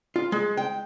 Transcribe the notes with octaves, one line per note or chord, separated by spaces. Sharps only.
F4
G#3
G5